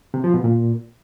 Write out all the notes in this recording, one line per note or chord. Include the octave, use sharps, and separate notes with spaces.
C3
F3
B2
A#2